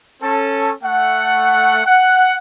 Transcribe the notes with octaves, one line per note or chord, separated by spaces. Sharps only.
C#4 A4
A3 F#5
F#5